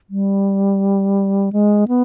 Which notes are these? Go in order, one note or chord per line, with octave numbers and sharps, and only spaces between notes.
G3
G#3
B3